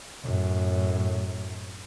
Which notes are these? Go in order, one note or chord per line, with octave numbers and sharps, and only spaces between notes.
F#2 A2